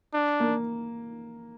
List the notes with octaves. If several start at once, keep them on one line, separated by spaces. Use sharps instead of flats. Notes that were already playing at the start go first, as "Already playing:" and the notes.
D4
A#3